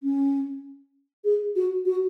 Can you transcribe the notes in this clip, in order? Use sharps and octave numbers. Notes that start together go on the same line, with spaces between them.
C#4
G#4
F#4
F#4